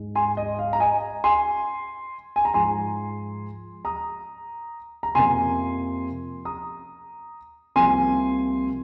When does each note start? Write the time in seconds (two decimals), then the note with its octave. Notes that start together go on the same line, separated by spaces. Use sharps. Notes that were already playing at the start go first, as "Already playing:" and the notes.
Already playing: G#2 G#3
0.15 G#5 C6
0.37 D#5
0.59 F5
0.73 A#5
0.80 D#5 G#5
1.24 G#5 C6
2.36 G#5
2.45 A#5
2.54 G#2 F3 G#3 G#5 C6
3.85 A#5 D#6
5.03 A#5
5.15 F2 C3 F3 A#3 G#5 C6
6.45 A#5 D#6
7.76 C2 C3 F3 A#3 G#5 C6